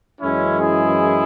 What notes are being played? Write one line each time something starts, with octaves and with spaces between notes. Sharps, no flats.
F#2 E3 G#3 C#4 E4
E4 G#4